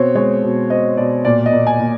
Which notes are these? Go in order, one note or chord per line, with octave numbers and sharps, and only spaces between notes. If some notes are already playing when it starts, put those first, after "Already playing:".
Already playing: B2 C4 C#5
G#3 C#5
B2
C4 D#5
B2 D5
A#2 D5
D#5
A#2
G#5
A#2